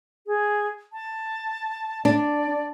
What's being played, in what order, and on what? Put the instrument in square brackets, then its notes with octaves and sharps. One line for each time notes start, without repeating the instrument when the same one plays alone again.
[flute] G#4
A5
[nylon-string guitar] D4 [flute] D5